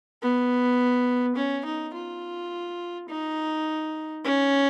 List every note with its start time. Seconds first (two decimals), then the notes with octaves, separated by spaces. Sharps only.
0.22 B3
1.36 C#4
1.65 D#4
1.94 F4
3.09 D#4
4.25 C#4